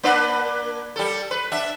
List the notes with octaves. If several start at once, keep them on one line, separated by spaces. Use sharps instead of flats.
A#3 D4 B4
G3 A4
B4
D4 E5